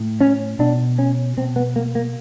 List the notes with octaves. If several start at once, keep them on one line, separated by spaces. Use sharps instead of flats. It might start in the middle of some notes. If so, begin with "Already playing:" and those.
Already playing: A2
C#4
B2 D4
C#4
B2 C4
B3
A#3
A#3